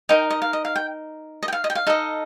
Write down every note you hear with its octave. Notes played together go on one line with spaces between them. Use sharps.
D#4 A#4 D#5 G5
D#5
F5
D#5
F5
G5
D#5
G5
F5
D#5
G5
F5
D#4 A4 D#5